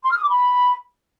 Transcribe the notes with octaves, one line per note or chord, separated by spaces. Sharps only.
C6
F6
D#6
D6
B5